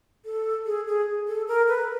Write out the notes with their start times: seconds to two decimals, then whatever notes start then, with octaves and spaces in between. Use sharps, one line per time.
0.25 A4
0.66 G#4
0.87 G#4
1.28 A4
1.48 A#4
1.68 B4